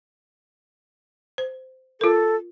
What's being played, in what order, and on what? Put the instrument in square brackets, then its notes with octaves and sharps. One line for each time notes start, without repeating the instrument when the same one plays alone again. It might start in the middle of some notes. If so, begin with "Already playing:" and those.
[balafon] C5
[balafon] F4 A#4 [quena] A4